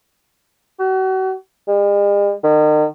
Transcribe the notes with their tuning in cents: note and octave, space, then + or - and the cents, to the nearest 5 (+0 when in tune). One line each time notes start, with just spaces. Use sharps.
F#4 +35
G#3 -45
D#3 -35